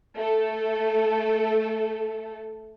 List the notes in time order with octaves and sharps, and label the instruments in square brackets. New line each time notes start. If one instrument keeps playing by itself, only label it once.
[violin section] A3 A4